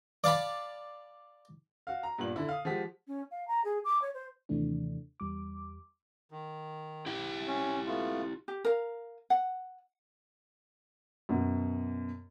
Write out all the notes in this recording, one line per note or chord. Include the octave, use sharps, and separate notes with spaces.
D5 F5 A5 B5
F#4 F5
A#5
G2 A#2 B3 F#7
D3 E4
F5 D#6
F3 G#3 F#4 G4 B6
C#4
F5
A#5
G#4
D6
C#5
C5
D#2 C3 E3 A3 D4
E2 G3 D6
D#3
E4 G4 G5
C#4
A3 B3 F4
G4
A#4 F5
F#5
F#2 B2